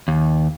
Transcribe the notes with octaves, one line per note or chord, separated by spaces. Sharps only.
D#2